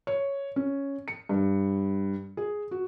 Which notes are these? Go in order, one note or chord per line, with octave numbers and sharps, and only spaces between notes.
C#5
C#4
C#7
G2
G#4
F#4